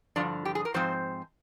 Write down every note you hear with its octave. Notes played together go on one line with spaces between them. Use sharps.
G2 D3 F3 D4
G4
G#4
A#4
G#2 F3 C4 C5